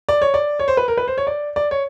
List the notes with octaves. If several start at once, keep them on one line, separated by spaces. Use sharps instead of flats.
D5
C#5
D5
C#5
C5
B4
A#4
B4
C5
C#5
D5
D5
C#5